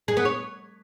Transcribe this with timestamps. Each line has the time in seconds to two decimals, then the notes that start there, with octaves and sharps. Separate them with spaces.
0.08 G#4
0.17 B3
0.25 C#5